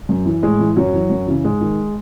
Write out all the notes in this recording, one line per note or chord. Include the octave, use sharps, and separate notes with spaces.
F#2
E3
A2 G#3
E3
F#2 F#3
E3
F#2
C#3 E3
G#2 G#3
D#3